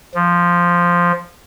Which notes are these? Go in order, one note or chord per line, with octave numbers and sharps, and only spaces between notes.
F3